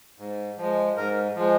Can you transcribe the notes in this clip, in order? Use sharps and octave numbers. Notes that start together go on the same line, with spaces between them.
G#2
F3 G#3
G#2 A#4
F3 G#3